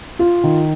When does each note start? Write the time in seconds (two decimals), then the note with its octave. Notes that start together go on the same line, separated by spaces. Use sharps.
0.19 F4
0.44 D#3